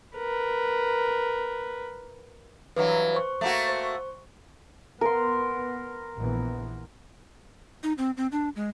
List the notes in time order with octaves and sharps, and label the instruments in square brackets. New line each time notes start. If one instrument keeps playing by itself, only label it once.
[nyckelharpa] A#4 B4
[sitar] G2 E3 F#3 [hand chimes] B4
[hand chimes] C5 C#6
[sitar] A3 A#3 F#4
[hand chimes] C5 C#6
[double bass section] B3 [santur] A#4 C6
[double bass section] A#1 E3 B3
[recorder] D#4
C4
C4
D4
G#3